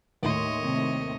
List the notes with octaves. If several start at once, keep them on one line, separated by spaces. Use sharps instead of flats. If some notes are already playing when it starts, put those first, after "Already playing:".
D#2 A2 C#5 D#5 C6
C3 A3 C4